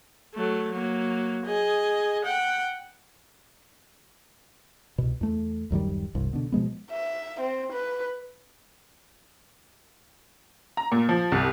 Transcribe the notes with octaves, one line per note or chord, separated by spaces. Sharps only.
F#3 A3
F#3 A#3
G#4 D#5
F#5 G5
C2 B2
E2 A3
D1 F#2 D#3 G3
E1 C2 G2
B2 D3
B2 F3 G#3 B3
E5
C4
B4
A#5
A#2
F3
C2